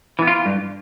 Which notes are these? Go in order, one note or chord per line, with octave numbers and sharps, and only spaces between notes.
E3 B3
F4
G2